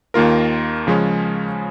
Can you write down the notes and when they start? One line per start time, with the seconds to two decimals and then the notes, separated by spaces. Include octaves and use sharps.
0.14 D#2 D#3 A#3 F4 A#4
0.87 C#3 F3 G#3 C#4